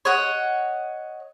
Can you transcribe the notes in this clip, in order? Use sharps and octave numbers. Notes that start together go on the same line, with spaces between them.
C#5 D#5 F#5